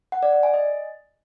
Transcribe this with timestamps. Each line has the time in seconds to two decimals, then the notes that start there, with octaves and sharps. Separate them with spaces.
0.12 F#5
0.23 D5
0.33 D5
0.43 G#5
0.54 D#5